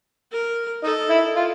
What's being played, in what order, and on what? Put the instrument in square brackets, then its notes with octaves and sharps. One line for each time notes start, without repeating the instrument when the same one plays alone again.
[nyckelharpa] A#4
[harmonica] D#4 [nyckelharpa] A4
[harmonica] E4
F4